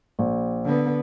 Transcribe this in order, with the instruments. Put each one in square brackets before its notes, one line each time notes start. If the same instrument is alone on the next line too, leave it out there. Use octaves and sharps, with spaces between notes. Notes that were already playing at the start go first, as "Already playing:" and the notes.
[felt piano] A#1
[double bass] D3 B3